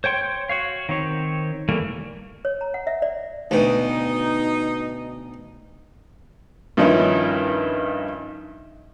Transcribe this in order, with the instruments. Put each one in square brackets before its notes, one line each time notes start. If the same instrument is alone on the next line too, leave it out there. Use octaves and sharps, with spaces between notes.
[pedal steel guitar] C5 C#5 G5 C6
F#4 C#5 F5
D#3 C4 C#5
E3 G3 A3 A#3
[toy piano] C#5
A#5
F#5
E5
D5
[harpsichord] D2 B2 [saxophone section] D#4
[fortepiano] G2 D#3 F3 C#4 D#4 E4